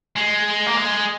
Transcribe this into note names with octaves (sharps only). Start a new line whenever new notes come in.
G#3
A#3
G#3